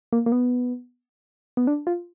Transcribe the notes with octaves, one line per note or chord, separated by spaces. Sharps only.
A#3
A#3
B3
B3
D4
F4